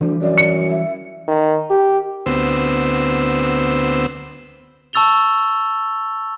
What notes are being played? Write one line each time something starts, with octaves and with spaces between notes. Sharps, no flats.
D2 E3 F3 G3
F#2 D5
C#7
E5
D#3
G4
D2 B3 C4 C5 E6
A5 C#6 E6 A6 F7 G7